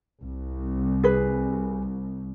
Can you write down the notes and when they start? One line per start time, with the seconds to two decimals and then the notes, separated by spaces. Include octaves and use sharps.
0.22 C2
1.04 G#4 B4